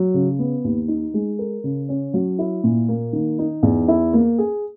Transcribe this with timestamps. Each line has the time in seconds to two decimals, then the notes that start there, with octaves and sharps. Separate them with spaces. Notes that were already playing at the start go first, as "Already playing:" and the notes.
Already playing: F#3
0.14 C#3
0.39 B3
0.64 D#2
0.88 D#4
1.14 G#3
1.39 A#4
1.64 C#3
1.89 C#4
2.14 F#3
2.39 E4
2.64 A#2
2.89 A#3
3.13 D#3
3.39 D#4
3.63 E2
3.88 E4
4.13 A#3
4.38 G#4